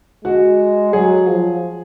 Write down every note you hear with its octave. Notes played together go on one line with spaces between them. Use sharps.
G#3 F#4
F#3 G#4
F3